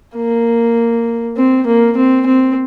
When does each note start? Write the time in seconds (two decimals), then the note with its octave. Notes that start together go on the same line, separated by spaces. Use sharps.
0.16 A#3
1.37 C4
1.67 A#3
1.97 C4
2.27 C4